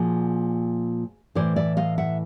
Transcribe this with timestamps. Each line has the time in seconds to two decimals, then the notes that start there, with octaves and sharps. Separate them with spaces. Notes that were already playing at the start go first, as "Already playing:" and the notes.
Already playing: A#2 F3 F#4 G#4
1.35 A2 E3 C5 D5
1.56 D5 E5
1.77 D#5 F5
1.98 E5 F#5